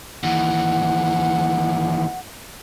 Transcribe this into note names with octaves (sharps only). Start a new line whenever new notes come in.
D#2 E3 F#5